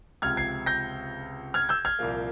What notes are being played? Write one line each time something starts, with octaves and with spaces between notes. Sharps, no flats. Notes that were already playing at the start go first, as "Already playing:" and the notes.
C#2 C3 F3 F6 G#6
G#6 C7
G6 A#6
F6 G#6
E6 G6
F6 G#6
C2 A#2 F3 A#3